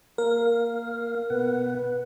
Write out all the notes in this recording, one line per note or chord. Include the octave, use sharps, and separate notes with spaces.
A#3 A#4 F5
B2 B4 F#5